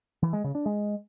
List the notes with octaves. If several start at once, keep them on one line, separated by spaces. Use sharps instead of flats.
E3
G#3
C#3
D4
G#3